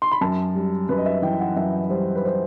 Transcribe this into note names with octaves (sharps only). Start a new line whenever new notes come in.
C6
B5
F#2 A5
G3
F#2 B4
D#5
E5
E3 G5
F#5
F#2 E5
G3 C5
B4
C5